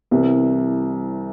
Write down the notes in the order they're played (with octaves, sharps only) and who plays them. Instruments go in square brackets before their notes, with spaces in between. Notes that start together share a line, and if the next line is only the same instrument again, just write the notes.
[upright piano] C2 C3 E3 G3